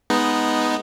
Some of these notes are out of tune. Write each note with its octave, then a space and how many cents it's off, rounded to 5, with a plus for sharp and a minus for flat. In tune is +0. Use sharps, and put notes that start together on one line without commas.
G#3 +0 B3 +0 D#4 +0